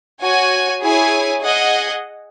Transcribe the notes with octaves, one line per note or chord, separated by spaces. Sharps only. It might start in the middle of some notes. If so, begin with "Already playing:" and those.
F#4 C#5 G#5
E4 G#4 C#5 G#5
G#4 D#5 F#5